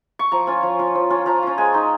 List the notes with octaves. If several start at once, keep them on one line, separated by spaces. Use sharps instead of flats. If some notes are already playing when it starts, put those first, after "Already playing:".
C#6
F3 A#5
C#4 F4
F3
C#4 F4
F3
C#4 F4
F3 A#5
C#4 F4
G#3 G#5
D#4